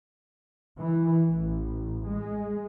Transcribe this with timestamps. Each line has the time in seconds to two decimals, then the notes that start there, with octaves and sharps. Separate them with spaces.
0.77 E3
1.31 A1
2.07 G#3